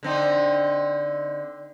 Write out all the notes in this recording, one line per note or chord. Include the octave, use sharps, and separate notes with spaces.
D3 C4 D#4